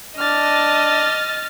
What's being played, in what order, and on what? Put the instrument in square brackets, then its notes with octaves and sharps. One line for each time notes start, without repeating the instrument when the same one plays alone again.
[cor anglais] D4 [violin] D#5 [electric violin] F6 A6